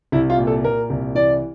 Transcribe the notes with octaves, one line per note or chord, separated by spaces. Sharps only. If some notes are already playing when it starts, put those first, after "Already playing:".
C2 E4
F4
A#2
A4
A#2 A#4
C2
E3 D5